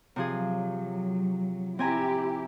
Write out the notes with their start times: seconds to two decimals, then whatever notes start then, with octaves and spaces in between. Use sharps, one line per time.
0.16 C3 F3 F#3 G#4
1.79 C4 E4 G4 G#5 A#5